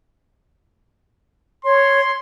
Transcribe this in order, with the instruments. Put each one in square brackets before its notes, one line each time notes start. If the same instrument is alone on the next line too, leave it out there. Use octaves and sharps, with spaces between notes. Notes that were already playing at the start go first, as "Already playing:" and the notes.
[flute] C#5 [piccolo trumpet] C6